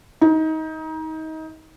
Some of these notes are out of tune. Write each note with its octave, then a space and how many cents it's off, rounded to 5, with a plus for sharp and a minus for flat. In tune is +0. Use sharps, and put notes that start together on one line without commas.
D#4 +25